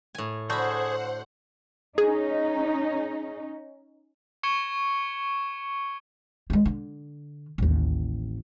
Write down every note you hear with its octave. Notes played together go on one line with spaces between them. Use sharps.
A2 G#5
D3 F#4 G#4 C5 F#5 B5 G6
C#4 D#4 G#4
C#6 G#6 C#7 E7 G7
G3 G#3
D3
A1 D#2